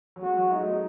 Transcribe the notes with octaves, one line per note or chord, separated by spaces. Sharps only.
F#3
G#3 F#4
F#3
G#3 D#4
A3
G#3